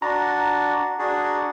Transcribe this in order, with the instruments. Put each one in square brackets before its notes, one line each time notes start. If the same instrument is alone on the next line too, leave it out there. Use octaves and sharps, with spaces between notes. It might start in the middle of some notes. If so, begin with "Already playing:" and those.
[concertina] D4 F#4 [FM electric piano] A#5
[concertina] D4 F#4 G#4